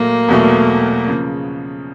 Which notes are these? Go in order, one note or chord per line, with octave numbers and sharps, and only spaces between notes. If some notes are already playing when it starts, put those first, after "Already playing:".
Already playing: A#2 F#3 A3 A#3
E2 B2 F#3 A3
C#3 F3